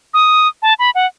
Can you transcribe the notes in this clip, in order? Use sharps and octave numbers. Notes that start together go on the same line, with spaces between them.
D#6
A5
B5
F#5